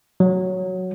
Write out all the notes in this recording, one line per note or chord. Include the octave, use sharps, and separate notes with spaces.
F#3